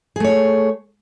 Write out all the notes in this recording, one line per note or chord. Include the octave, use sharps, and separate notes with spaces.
A3 G#4 C#5